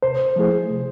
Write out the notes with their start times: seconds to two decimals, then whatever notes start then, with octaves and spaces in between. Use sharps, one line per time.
0.02 C3 C5
0.36 F3 A3 E4 G#4
0.70 C3